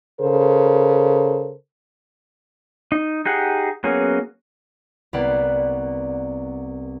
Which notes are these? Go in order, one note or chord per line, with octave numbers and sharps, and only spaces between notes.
C#3 A4 A#4 C5
D#4
D#4 G4 G#4 F#5
F#3 A#3 B3 C#4 G#4
C2 A#3 B3 D5 F#5